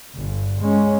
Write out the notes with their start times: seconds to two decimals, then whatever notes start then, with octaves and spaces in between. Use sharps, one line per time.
0.15 G1
0.59 G#3 C#4